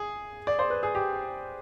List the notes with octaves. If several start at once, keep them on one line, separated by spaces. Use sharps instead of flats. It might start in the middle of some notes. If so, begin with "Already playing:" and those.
Already playing: G#4
D5
C5
B4
G#4
G4